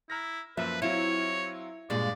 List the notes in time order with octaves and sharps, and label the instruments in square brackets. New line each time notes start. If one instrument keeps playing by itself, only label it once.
[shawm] E4 [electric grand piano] A#5 F6 A#6
[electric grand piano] F#2 F3 A#3 [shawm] B4 [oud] E5
[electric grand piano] F#3 C4 F4 [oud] E4 [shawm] C#5
[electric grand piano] G2 G#4 [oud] A#2 G#3 [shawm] D5